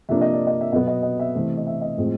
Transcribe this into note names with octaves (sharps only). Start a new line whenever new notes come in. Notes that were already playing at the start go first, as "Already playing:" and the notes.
C3 F3 A#3 D4 E5
D#5
D5
D#5
E5
B2 F#3 B3 D#5
D#5
D#5
E5
C3 E3 A3 C4
D#5
E5
D#5
A2 F3 G#3 C4